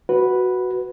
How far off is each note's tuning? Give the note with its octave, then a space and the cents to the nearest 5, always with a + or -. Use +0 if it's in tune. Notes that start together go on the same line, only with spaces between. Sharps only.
F#4 +0 B4 +0